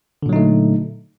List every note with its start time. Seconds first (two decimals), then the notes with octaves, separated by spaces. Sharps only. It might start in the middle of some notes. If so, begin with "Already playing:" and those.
0.23 D3
0.26 A#2
0.29 F#3
0.33 D#4
0.36 A3